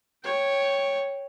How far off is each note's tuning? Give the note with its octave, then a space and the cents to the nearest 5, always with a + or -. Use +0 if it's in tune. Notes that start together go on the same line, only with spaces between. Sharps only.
C#5 +0 G5 +0